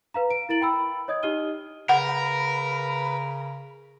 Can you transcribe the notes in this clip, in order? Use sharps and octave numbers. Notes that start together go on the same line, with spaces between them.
B4 F5 A#5
D7
E4 A#4 A#5 A6 D7 F#7
G5 B5 E6
C#5 D#5 D#6 G#6
D#4 G4 D#5 F6 D#7 G7
C#3 A#4 B4 F#5